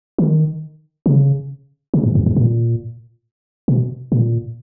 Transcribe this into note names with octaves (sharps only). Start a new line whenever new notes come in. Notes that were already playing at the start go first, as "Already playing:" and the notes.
D#3
C#3
C#3
G#2
F#2
G#2
A#2
B2
A#2